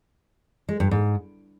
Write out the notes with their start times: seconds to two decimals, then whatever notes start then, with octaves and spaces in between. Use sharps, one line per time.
0.69 G#3
0.80 G2
0.91 G#2